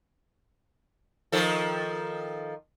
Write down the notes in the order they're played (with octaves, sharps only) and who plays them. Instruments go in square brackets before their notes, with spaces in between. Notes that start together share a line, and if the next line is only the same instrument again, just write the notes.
[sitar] D#3 F3 A4